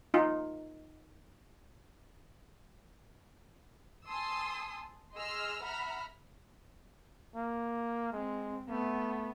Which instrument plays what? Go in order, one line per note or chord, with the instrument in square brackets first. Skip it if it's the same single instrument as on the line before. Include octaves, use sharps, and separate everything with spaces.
[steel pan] D#4 F4
[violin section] G#5 A5 C6 D#6 E6
G#4 D#5 C6 E6 F6
E5 F#5 A#5 B5 F6
[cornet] A#3
[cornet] G#3 [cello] C4
[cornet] A3 [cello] B3